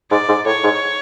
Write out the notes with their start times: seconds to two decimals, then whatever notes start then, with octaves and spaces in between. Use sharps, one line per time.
0.11 G#2 D5
0.29 G#2
0.46 A2 C#5
0.64 G#2